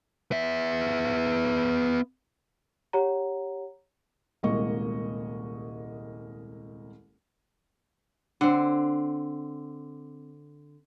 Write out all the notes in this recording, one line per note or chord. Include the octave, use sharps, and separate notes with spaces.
B3 E5
G4 C#5 F#5 A#5
D#1 C2 G#3 A#3 D#5 C#6
D3 C4